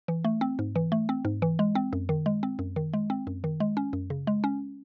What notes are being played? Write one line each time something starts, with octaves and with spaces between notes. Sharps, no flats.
E3
A3
C4
G#2
E3
A3
C4
G#2
E3
G#3
C4
F#2
D#3
G#3
C4
F#2
D#3
G#3
C4
F#2
D#3
G#3
C#4
F#2
C#3
G#3
C#4